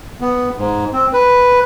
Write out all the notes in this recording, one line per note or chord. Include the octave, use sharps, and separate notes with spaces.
B3
G#2
C4
B4